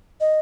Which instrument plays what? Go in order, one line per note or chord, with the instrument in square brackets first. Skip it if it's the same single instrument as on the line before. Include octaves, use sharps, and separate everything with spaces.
[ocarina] D#5